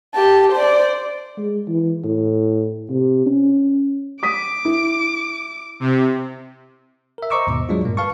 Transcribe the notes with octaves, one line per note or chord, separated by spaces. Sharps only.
G4 A5
C5 D5
G#3
E3
A2
C3
C#4
D6 D#6 B6 D#7
E4
C3
A#4 E5
C5 D#5 A#5 C#6 D6 E6
D#2 G#2 B2
F#3 G#3 D4 F4
G2 A#2 A#3
B4 F5 A5 C#6